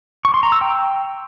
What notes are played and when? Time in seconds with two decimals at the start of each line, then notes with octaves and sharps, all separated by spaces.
0.25 C#6
0.34 C6
0.43 A#5
0.52 E6
0.61 G5